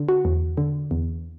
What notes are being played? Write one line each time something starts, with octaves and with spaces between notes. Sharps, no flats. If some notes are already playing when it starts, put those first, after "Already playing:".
Already playing: D3
F#4
E2
D3
E2